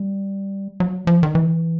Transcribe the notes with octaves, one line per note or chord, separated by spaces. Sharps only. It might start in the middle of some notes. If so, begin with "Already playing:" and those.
Already playing: G3
F#3
F3
D#3
E3